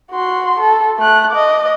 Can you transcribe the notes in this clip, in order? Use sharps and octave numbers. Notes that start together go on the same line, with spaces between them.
F#4 C6
A4
A3 F#6
D#5 D6